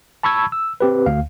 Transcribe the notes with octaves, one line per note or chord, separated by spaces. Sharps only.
A5 B5 C#6 E6 G#6
E6
C4 G4 B4
D2 F5